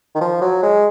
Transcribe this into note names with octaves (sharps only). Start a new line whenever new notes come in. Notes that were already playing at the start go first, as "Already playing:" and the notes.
D#3
F3
F#3
G#3